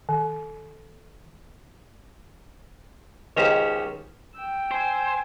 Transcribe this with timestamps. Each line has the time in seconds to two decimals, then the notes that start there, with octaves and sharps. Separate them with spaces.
0.09 D#3
3.37 C#2 D#3 C#4 G4 C5 A#5
4.36 G5 E6
4.71 C5 G#5